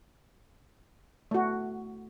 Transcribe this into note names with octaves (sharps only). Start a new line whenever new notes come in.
A3 F#4